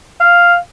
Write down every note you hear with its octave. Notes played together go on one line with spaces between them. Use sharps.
F5